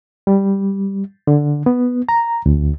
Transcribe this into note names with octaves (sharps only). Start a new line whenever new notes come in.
G3
D3
B3
A#5
D2